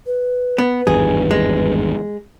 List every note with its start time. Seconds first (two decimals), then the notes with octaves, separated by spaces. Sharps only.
0.06 B4
0.58 B3
0.87 G#1 E2 G2 G#4
1.31 G#3